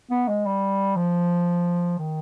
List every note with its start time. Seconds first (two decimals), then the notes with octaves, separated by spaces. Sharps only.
0.10 B3
0.28 G#3
0.45 G3
0.96 F3
1.99 D#3